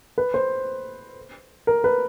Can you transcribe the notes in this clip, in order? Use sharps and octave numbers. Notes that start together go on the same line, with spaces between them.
B4
C5
A#4
B4